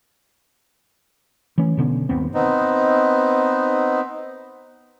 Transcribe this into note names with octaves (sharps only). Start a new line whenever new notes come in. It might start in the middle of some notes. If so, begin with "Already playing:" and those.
E3 A3 C#4
B2 D3 B3 C#4
G1 D#2 B3 C4
B3 C4 D#4